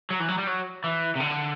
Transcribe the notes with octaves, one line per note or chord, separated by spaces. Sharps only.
F#3
E3
F#3
G3
F#3
E3
C3
D3